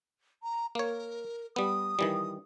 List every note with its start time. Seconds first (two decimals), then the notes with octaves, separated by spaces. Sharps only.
0.43 A#5
0.75 A#3 A#4 C#5
1.56 G3 B3 D#6
1.99 D#3 E3 G3